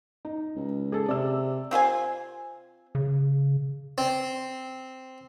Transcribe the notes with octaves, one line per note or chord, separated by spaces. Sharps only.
D#4
C#2
G#4 A4
C3 D5 E6
C4 F4 C5 G#5
C#3
C4